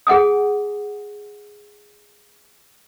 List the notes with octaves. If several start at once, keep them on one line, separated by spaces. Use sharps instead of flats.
G#4 F#5 G#5 D#6